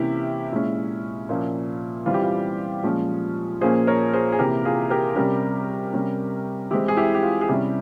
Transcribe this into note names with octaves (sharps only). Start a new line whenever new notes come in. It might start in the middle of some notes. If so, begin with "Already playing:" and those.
Already playing: C3 E3 A#3 C#4 E4 G4
A#2 G#3 C#4 E4
A#2 F3 A#3 C#4
E3 G3 C4 F4
G4
F4
A#2 F3 G#3 C#4
A#2 F3 A#3 C#4 G#4 C5
A#4 C#5
G#4 C5
G#4
C3 E3 A#3 G4 A#4
F4 G#4
G4 A#4
C3 G3 C#4 G4 A#4
C3 G3 C#4
E3 G#3 C4 E4 G4
G#4
E4 G4
G4
F4
G#4
C3 G3 C#4 E4 G4